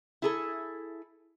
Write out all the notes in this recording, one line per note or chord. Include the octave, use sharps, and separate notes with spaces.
E4 G#4 A4